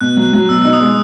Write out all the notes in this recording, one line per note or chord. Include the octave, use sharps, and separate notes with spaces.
B2 F#6
F#3
F#3
B2 E6
D#4
D#6
G#3